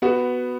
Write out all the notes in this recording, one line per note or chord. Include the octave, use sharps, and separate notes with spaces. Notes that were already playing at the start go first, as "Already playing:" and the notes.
B3 F#4